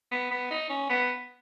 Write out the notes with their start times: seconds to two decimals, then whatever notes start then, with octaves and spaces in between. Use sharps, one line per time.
0.11 B3
0.31 B3
0.51 D#4
0.69 C#4
0.89 B3